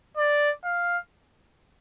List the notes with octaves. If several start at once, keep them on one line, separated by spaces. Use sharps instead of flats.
D5
F5